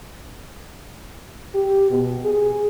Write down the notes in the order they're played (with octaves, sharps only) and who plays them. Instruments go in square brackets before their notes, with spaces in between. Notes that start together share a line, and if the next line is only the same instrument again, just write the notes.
[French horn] G4
B2
G#4